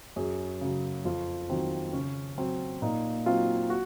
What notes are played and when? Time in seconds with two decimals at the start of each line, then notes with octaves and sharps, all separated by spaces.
0.16 F#2 G#4
0.61 C#3 F#3
1.05 F2 F4
1.50 D#3 F#3 C4
1.93 C#3 C#4
2.38 F#3 C4
2.82 A#2 D#4
3.26 F#3 C4 F4
3.70 F#4